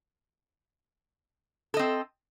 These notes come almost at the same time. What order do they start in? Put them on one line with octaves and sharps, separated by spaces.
A4 D#5 C4